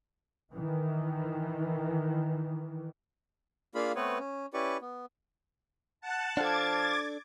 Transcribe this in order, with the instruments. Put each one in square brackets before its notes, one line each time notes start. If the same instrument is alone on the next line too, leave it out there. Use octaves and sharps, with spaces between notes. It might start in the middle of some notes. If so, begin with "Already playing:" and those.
[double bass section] D#3 E3
[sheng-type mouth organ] A#3 D4 F4 G#4 F5 B5
A3 B3 C4 B4 C#5
C#4
C#4 E4 G4 B4 D5 C#6
B3
[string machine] F#5 A5
[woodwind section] F3 F5 A5 [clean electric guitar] D4 A4 [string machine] D6 G#6 A6